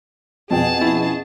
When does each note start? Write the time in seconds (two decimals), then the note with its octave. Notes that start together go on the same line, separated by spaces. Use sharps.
0.51 F2 B2 G#4 G5 A5
0.81 C#4 E4